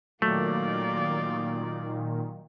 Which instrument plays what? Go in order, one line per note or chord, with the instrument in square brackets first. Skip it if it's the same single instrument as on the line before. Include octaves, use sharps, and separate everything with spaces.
[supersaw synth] A#2 D#3 [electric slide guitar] F#3 [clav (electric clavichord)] A3 [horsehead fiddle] A#3 D5